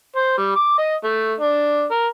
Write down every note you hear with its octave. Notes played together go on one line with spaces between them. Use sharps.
C5
G3
D6
D#5
A3
D4
A#4